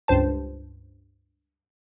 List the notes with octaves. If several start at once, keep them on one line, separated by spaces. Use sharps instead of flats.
C#2 G2 C5 A5